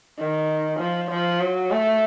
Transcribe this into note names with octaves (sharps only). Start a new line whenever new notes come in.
D#3
F3
F3
F#3
A3